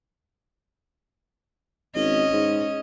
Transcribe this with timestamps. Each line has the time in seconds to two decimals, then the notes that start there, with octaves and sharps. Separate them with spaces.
1.95 G#1 C#4 D#5
2.32 G#2